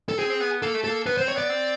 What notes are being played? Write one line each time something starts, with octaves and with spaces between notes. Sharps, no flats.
A4
C4 G#4
C4
B3
A#3 A4
A3
A#3 A4
B3 B4
C5
C4
C#5
B3 D5
C4